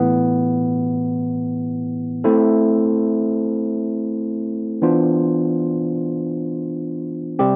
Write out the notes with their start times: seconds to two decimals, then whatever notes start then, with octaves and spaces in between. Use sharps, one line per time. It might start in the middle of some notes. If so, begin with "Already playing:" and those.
Already playing: A2 E3 B3
2.24 A3 C4 E4 A4 C5
4.82 E3 B3 D4 F4 C5
7.39 C3 G3 C4 G4